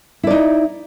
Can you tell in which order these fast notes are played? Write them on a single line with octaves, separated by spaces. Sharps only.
E4 D5 D#4